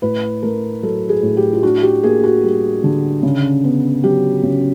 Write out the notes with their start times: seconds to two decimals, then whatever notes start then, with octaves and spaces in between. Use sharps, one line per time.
0.02 A2 B4
0.43 A3 A#4
0.83 F#3 A4
1.09 G#4
1.23 A2
1.37 G4
1.53 F4
1.63 D4 F#4
1.83 G4
2.03 A#3 G#4
2.24 F#4
2.44 G3
2.84 D3
3.23 C#3
3.64 B3
4.04 F#3 G4
4.43 C#3